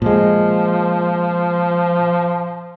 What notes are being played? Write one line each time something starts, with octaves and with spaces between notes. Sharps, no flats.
A#2 F3 G#3